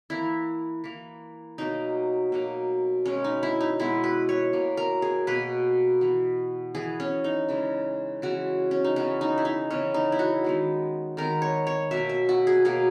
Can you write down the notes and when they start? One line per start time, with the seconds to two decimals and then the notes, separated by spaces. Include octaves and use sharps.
0.10 E3 A#3 E4
0.84 E3 A#3
1.58 B2 F#3 A#3 D#4
2.32 B2 F#3 A#3
3.06 B2 G#3 B3 C#4
3.24 D#4
3.43 E4
3.61 D#4
3.80 B2 G#3 B3 E4
4.04 B4
4.29 C#5
4.53 B2 A#3
4.77 A#4
5.02 G#4
5.27 B2 A#3 B4
6.01 E3 B3
6.75 E3 B3 G#4
7.00 C#4
7.24 D#4
7.49 C#3 E3 G#3
8.22 C#3 E3 G#3 F#4
8.71 C#4
8.84 D#4
8.96 C#3 E3 B3 C#4
9.21 D#4
9.38 E4
9.45 D#4
9.71 C#3 E3 B3 C#4
9.94 D#4
10.12 E4
10.19 F#4
10.44 D#3 G#3 B3
11.17 D#3 G#3 B3 A#4
11.42 C#5
11.67 C#5
11.91 B2 F#3 A#3 E5
12.09 E5
12.29 F#4
12.47 G#4
12.65 B2 F#3 A#3 G#4